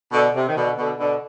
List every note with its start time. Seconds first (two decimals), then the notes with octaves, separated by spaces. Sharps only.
0.12 B2 D3
0.34 C3
0.47 D#3
0.55 B2 D3
0.77 B2 D3
0.98 B2 D3